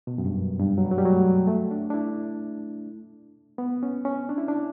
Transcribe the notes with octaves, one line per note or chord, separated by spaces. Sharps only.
B2
F#2
G2
G2
F#3
G3
F#3
G3
F#3
A3
A3
D4
D4
E4
B3
C#4
C#4
D4
E4
D4